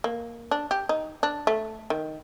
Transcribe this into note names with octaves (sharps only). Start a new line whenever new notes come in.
A#3
D4
G4
D#4
D4
A3
D#3